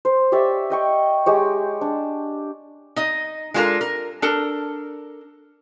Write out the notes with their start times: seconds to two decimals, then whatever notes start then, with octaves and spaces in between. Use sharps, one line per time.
0.05 C5
0.32 G4 C#5 D5 E5
0.70 D#5 G5 C#6
1.26 G#3 G4 C#5
1.81 D4
2.96 D#4 D#5
3.54 G#3 D4 F4 G4 A4 A#4
3.81 A#4
4.22 D4 A4 A#4